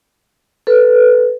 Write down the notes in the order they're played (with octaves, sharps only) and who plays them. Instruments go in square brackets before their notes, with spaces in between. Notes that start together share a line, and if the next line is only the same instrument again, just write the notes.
[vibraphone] A4 B4